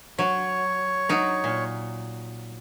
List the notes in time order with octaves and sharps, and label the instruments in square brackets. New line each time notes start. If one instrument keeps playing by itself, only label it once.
[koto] F#3 [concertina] C#5
[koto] F#3 D#4
A#2